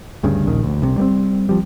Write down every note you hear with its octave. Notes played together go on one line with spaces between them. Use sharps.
D2 G2 C#3
A#1 D#2 D#3
D2
C2 C3
G3 A#3 C4
F3 G3